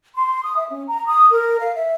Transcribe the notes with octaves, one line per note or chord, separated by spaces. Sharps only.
C6
D#6
E5
C#4
A#5
D#6
A#4
F5
E5